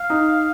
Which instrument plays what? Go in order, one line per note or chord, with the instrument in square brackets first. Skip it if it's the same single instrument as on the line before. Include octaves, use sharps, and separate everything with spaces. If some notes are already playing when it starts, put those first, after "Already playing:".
Already playing: [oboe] F5
[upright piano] D#4